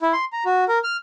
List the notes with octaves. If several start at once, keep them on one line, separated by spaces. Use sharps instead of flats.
E4
C6
A#5
F#4
A#4
F6